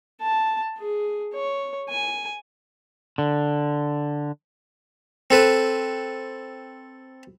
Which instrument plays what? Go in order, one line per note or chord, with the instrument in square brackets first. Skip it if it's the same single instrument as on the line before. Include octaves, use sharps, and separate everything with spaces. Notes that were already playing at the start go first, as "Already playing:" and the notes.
[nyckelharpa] A5
G#4
C#5
G#5
[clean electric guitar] D3
[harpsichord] C4 A4 B4